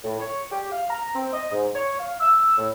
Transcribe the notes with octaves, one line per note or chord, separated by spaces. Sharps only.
A2
C#5
G4
F5
A#5
C4
D#5
G#2
C#5
F5
E6
A2